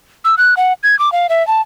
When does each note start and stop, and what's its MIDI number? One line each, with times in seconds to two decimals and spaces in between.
0.25 0.35 88
0.38 0.54 90
0.57 0.73 78
0.83 0.98 92
0.99 1.12 86
1.12 1.27 77
1.29 1.45 76
1.47 1.61 81